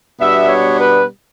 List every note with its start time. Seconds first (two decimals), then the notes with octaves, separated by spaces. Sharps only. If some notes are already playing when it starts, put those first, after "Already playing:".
0.19 B2 G3 B3 D4 E5
0.48 C#5
0.78 B4